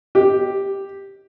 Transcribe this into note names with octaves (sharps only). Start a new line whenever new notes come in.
G4